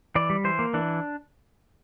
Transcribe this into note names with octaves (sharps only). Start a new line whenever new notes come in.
E3 D5
G3
E3 C5
A#3
E3 D4